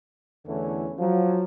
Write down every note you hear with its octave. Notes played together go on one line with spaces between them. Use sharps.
E2 D3 E3 A3 C#4
F3 F#3